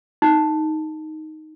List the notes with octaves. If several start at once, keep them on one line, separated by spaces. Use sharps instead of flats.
D#4